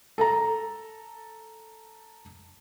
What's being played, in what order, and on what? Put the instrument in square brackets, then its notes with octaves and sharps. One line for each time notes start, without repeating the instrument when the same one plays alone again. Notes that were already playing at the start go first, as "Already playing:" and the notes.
[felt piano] A4 A5 A#5